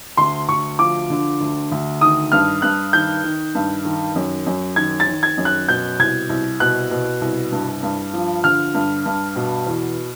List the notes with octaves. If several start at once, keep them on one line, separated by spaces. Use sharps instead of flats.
D2 C6
D2 C#6
F3 D6
D3
D2
D2
D#3 D#6
G2 F6
G2 F#6
D#3 G6
D#3
G2
D#3
F#2
F#2
D#3 G#6
A6
D#3
G#6
F#2
F#6
B2 G6
C2 G#6
C2
B2 F#6
B2
C2
G2
G2
F3
D3 F6
G2
G2
B2
E2